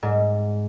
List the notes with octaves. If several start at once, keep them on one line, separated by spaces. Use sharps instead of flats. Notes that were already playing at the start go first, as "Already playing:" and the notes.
G#2